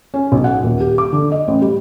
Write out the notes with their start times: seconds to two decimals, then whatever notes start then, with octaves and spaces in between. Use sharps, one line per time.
0.14 C#4
0.32 B1
0.44 F#5
0.63 D#1
0.80 G4
0.98 D6
1.13 D3
1.32 D#5
1.48 A1
1.62 G3